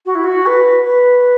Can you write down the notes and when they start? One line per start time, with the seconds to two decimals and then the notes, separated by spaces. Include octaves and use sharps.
0.05 F#4
0.14 E4
0.23 F#4
0.46 B4
0.84 B4